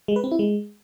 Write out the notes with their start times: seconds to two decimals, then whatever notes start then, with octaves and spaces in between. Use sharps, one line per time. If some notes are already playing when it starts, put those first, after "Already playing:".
0.08 G#3
0.16 B4
0.24 C4
0.31 E4
0.39 G#3